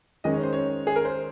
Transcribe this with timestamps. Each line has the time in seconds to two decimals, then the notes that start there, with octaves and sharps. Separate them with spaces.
0.24 D#3 G#3 C#4 D#5
0.34 C#5
0.43 C5
0.53 C#5
0.87 G#4
0.96 A#4
1.05 C5